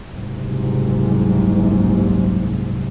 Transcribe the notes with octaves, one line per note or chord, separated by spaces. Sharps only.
F#1 C2 G#2 C3